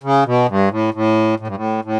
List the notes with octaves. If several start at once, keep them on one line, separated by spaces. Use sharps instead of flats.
C#3
B2
G2
A2
A2
A2
G2
A2
A2